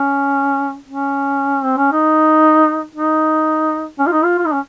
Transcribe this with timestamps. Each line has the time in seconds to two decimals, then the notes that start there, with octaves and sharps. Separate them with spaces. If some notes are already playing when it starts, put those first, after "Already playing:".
Already playing: C#4
0.88 C#4
1.63 C4
1.77 C#4
1.92 D#4
2.95 D#4
3.99 C#4
4.07 F4
4.12 D#4
4.24 F4
4.38 F4
4.45 D#4
4.52 C#4